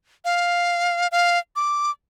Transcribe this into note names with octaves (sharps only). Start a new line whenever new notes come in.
F5
F5
D6